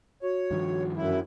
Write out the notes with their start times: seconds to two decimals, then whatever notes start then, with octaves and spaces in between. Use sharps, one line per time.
0.22 F#4 C#5
0.51 G2 D#3 F3
0.96 F#2 E4